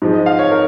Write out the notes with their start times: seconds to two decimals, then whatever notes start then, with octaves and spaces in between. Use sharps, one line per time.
0.02 G#2 F3 G#3
0.14 D#5
0.26 F5
0.39 C#5
0.51 A#4